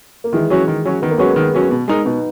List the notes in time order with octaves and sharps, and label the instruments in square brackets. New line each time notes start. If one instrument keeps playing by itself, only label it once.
[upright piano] A#3
[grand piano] D#3 [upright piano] E3 G#3
[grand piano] F#3 C#4 F#4
D#3
F#3 C#4 F#4
[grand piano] D#3 [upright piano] B3
[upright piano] A#3
[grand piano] F#3 C#4 F#4 [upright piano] G#3 B3
[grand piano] D#3
F#3 C#4 F#4
B2
G#3 D#4 A#4
[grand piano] B2 [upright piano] B3 D#4